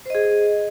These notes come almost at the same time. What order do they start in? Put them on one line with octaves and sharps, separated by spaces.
C5 D#5 G#4